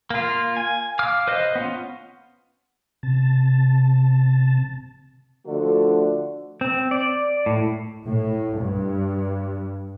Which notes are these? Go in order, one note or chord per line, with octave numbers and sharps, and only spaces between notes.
A#3 F4
G#5
F5 D6 F6
B4 C5 D#5 F5
B3 C#4 F4
C3 A5
D3 F3 A3 F#4 A4 D5
C4
D5
A2
A2
G2